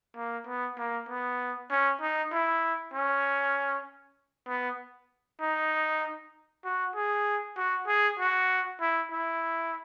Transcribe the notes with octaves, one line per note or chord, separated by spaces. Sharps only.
A#3
B3
A#3
B3
C#4
D#4
E4
C#4
B3
D#4
F#4
G#4
F#4
G#4
F#4
E4
E4